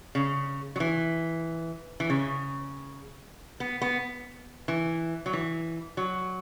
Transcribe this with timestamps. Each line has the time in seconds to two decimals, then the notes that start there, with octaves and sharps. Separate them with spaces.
0.15 C#3
0.76 F#3
0.80 E3
2.00 E3
2.10 C#3
3.60 B3
3.82 B3
4.68 E3
5.26 F#3
5.33 E3
5.97 F#3